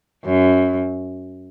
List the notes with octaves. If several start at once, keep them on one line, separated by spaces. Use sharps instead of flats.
F#2